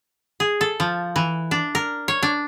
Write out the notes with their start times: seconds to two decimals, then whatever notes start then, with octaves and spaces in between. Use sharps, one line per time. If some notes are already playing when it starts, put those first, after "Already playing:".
0.40 G#4
0.61 A4
0.80 F3
1.16 E3
1.51 D4
1.75 A#4
2.08 C#5
2.23 D4